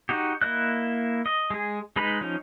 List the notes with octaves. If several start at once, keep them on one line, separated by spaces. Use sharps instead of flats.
D#4 F#4 G4
A#3 E4 D#5 F#6
D#5
G#3 G#4
G#3 D#4 B4 B5
F3 C#4 D#4